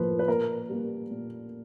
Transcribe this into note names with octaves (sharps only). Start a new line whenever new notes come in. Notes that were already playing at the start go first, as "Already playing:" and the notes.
Already playing: A2 F3 A#3 B4
B4
A#2 A#4
G3 A#3
A#2